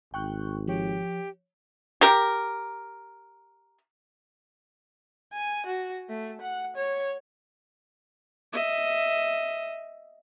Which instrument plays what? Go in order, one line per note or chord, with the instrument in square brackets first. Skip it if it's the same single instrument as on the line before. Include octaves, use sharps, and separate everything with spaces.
[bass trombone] G#1 [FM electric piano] G5 C#6 F#6
[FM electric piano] F3 C#5 [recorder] G4
[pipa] G4 A#4
[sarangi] G#5
F#4
A3
F#5
C#5
[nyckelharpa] D#5 E5